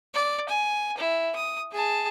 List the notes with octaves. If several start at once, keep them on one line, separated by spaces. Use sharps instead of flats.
D5
G#5
E4
D#6
G#4 A5